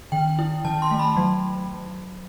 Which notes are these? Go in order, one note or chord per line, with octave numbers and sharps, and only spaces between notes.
D#3 G5
E4
D#3 A5
C6
A3
B5
F#3